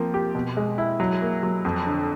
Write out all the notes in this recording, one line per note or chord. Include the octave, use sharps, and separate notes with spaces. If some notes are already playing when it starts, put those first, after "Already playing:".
Already playing: F3 A#3 C4
G4
B2
G#3
E4
F#3
A#3
F#3
F2
D3